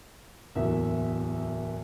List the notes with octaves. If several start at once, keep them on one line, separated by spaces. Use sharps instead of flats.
D1 E2 A#3 E5